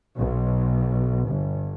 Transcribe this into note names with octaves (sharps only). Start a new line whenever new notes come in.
B1
G1